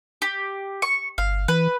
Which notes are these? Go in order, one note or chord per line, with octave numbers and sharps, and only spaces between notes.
G4
C#6
G1 F5
E3 B4